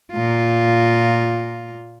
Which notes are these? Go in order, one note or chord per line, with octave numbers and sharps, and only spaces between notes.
A#2 F4